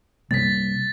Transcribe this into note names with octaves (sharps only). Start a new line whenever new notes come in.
C3 G3 A#3 A6 B6